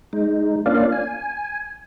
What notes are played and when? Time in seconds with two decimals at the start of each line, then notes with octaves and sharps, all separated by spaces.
0.13 G#3 D#4
0.66 A#3 C#4 D4 F4 D5 F5
0.92 G#5